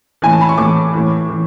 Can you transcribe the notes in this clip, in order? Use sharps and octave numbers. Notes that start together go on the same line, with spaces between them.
A2 E3 G#5
A5
B5
C#6
A2 E3 D6
A2 E3
E3